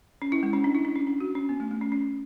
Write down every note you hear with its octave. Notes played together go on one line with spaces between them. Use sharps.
C#4
E4
G#3
C#4
D4
E4
D4
C#4
D4
F#4
C#4
B3
A3
A3
C#4
C#4